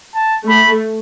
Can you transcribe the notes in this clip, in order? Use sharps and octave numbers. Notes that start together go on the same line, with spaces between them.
A5
A3 B5